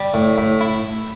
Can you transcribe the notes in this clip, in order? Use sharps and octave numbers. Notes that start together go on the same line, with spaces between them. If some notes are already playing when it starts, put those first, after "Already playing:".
Already playing: G3
A2
A2
E4